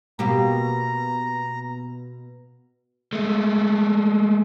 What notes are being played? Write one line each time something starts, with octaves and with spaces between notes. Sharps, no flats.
B2 A#3 G4 A#5
G#3 A3